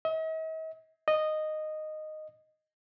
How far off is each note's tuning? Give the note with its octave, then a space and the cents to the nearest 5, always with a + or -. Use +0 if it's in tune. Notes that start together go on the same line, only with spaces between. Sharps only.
D#5 +45
D#5 -10